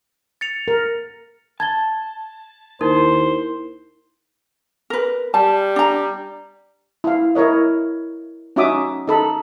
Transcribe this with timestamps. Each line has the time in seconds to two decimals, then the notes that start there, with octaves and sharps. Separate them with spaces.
0.41 A6 C#7 F7
0.68 A#4
1.60 A5 G#6 A6 G7
2.81 D#2 D#4 E4 A#4 C5
4.90 A#4 B4
5.34 G3 A5
5.76 D4 A#5
7.04 E4 F5
7.35 E4 A#4 C#5 D#5
8.56 C#4 D#4 F#4 E5 D6 D#6
9.08 D#4 A4 B5